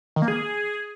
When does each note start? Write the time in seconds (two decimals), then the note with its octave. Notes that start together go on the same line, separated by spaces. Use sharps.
0.16 D#3
0.22 A#3
0.28 G#4